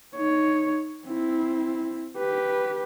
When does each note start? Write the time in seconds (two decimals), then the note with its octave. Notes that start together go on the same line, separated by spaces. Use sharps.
0.16 D#4 C#5
1.06 C4 E4
2.17 G4 B4